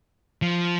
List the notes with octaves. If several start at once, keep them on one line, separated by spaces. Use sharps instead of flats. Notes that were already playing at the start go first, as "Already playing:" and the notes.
F3